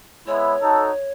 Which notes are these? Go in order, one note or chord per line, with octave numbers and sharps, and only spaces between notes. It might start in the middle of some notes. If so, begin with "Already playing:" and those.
G#3 B3 E4 C#5
D#4 F#4 A4